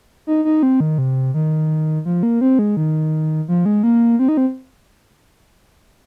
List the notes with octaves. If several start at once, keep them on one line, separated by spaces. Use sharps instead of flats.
D#4
D#4
C4
D#3
C3
D#3
F3
A#3
C4
G#3
D#3
F3
G#3
A#3
C4
D#4
C4